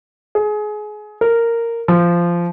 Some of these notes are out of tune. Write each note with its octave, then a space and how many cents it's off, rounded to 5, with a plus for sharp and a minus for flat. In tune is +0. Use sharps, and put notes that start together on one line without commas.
G#4 +25
A#4 -10
F3 -15